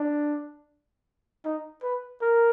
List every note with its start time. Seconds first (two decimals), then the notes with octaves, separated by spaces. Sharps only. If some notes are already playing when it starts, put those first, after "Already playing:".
Already playing: D4
1.45 D#4
1.83 B4
2.22 A#4